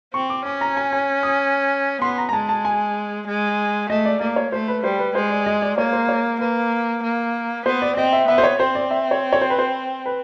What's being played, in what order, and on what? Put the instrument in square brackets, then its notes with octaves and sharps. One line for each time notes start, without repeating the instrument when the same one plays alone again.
[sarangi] C4 [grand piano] C#6
[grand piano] D6
[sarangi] C#4 [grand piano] D6
[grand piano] A#5
G#5
G#5
D#6
[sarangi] B3 [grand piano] C6
[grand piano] A#5
A#5
[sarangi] G#3 [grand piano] A5
[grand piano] A5
G#5
[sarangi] G#3
[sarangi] A3 [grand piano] D#5
[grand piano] D5
[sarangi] A#3 [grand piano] D5
[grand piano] C#5
[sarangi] A3 [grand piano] C5
[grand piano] B4
[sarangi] G3 [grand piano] C5
[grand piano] B4
[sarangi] G#3 [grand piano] C5
[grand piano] D5
D#5
D5
[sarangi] A#3 [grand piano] C#5
[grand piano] C5
C#5
[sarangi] A#3 [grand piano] B4
[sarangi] A#3
[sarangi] B3 [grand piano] C5
[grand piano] D5
[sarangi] C4 [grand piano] D#5
[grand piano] E5
[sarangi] B3 [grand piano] E5
[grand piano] C5
C#5
[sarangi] C4 [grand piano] C5
[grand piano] D5
E5
C#5
C#5
C5
B4
C5
B4